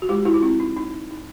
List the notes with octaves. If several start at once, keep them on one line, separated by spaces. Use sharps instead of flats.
F#4
G#3 F4 G4
E4 F#4
F4
C4 E4
D#4
D#4
D#4